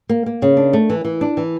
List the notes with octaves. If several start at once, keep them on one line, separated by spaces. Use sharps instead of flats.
A#3
A#3
C#3
D4
A3
E3
E3
D4
E3